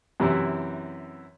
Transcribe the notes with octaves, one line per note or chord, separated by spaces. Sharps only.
F#2 C3 E3 E4